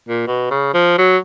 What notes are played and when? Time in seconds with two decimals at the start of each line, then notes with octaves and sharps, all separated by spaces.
0.09 A#2
0.27 B2
0.51 C#3
0.74 F3
0.98 F#3